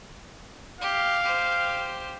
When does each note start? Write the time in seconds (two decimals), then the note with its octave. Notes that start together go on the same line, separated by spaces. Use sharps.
0.81 G4 F5
1.22 G4 C5